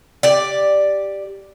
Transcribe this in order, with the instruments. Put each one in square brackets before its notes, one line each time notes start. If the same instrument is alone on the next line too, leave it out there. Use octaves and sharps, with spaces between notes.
[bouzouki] G4 D5